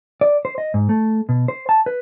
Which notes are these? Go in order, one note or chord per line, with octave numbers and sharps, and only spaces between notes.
D5
C5
D#5
G#2
A3
B2
C5
A5
B4